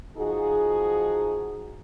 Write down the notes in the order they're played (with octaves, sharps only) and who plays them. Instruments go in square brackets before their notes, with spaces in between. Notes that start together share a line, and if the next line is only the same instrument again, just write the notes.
[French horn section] F3 D#4 F#4 G#4